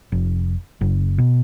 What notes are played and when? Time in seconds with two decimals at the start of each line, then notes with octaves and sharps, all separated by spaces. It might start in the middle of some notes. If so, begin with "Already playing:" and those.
0.12 F1
0.81 F#1
1.18 B2